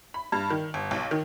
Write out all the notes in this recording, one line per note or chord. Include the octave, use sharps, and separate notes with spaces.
B5
G2
D#3
G1
B1
D#3